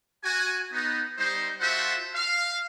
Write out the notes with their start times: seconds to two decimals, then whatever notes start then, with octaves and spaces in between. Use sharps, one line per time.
0.24 F#4 G#5
0.72 B3 D#4
1.18 G3 D#4 C5
1.60 F4 F#4 A4 C5 E5 F#5
2.15 F5